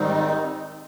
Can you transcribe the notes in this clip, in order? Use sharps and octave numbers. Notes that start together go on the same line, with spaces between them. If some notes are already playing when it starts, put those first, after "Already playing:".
Already playing: G#2 D#3 G3 C4 D#4